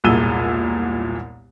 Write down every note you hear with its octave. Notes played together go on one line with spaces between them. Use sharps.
E1 C2 A#2 E6 D#7 G7